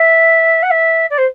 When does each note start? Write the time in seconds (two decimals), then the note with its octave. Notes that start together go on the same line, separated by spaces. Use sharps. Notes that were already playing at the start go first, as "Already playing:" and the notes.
Already playing: E5
0.63 F#5
0.70 E5
1.10 D5
1.18 C5